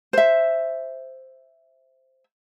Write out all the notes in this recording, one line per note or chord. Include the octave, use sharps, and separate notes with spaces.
C5 E5